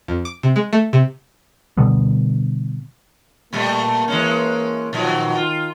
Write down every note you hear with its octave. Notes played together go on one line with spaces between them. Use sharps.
F2
D6
C3
G#3
A3
C3
B2 D3 G3 B3
A#2 G3 A3 A#3
E3 G#3 C#4
A#2 D#3 F3 F#3
F4